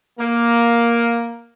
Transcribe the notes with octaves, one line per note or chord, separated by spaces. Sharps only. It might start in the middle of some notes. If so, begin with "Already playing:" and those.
A#3